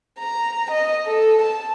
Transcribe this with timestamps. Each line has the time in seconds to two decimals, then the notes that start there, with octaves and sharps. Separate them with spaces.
0.19 A#5
0.71 D#5
1.07 A4
1.42 A5